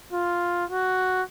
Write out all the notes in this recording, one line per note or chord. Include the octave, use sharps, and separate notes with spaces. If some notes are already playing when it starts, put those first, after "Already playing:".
F4
F#4